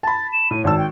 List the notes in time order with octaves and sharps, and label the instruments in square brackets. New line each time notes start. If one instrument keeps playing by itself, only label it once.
[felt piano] A5 B5 [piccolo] A6
[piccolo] E7
[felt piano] A2 [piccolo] D#7
[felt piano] G#1 D#3 E6 [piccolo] A5
[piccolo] G5